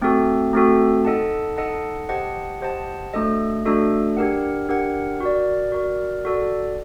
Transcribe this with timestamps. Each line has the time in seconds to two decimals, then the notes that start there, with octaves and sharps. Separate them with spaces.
0.01 A3 C4 F#4 A4
0.53 A3 C4 F#4 A4
1.05 D#4 A4 D#5 F#5 A5
1.57 D#4 A4 D#5 F#5 A5
2.09 G4 C5 D#5 F#5 A5
2.61 G4 C5 D#5 F#5 A5
3.14 A3 D4 F#4 A4 D#5
3.66 A3 D4 F#4 A4 D#5
4.17 D4 G4 A#4 F#5
4.69 D4 G4 A#4 F#5
5.21 F#4 A#4 D5
5.72 F#4 A#4 D5
6.25 F#4 A4 D5